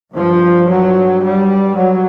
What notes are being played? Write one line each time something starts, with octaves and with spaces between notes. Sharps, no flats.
G2 F3
F#3
G3
F#3